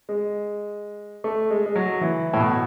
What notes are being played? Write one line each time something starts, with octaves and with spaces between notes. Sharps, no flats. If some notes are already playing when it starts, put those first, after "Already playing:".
G#3
A3
G#3
G#3
F#3
E3
A2
B2